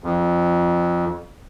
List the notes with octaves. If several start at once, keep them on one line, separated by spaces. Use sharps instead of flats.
F2